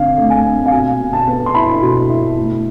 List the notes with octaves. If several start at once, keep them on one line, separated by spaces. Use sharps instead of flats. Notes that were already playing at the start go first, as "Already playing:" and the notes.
Already playing: D3 C4 F5
A3
G#5
C4
F5
B2 G#5
B2
A5
B3
C6
E4 B5
B2
E4
A3